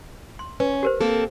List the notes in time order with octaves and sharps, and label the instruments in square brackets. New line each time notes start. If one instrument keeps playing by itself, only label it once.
[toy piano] C6
[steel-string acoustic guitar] C#4 [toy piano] B4
[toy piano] G4 A#4 C5
[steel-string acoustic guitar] A#3 C4 A4